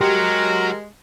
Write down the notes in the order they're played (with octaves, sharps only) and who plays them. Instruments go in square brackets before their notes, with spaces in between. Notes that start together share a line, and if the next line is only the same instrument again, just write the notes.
[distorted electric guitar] F#3 [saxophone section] G#3 [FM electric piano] G4 C6 A#6 [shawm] A#4